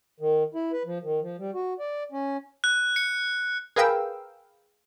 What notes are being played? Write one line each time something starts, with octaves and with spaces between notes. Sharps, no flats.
D#3
E4
B4
F3
D#3
F3
G3
F#4
D5
C#4
F#6
C#7
G#4 A#4 B4 F5 G5 E6